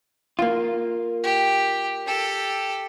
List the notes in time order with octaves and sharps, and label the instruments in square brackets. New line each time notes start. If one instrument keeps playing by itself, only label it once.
[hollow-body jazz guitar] A#3 F4
[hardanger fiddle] G4
G4 A4